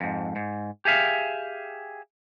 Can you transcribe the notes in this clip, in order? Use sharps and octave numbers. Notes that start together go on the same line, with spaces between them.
F2 G#2
G#2
G4 G#4 E5 F5